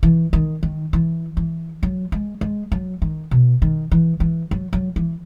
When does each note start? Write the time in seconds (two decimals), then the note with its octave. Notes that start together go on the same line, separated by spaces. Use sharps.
0.03 E3
0.33 D#3
0.63 D#3
0.93 E3
1.37 E3
1.83 F#3
2.12 G#3
2.41 G#3
2.72 F#3
3.02 D#3
3.31 B2
3.62 D#3
3.91 E3
4.20 E3
4.51 F#3
4.73 F#3
4.96 E3